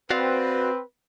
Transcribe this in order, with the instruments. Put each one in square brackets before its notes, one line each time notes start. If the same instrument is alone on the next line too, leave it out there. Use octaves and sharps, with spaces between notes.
[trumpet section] C4 [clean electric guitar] F#4 D5 F5 [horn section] B4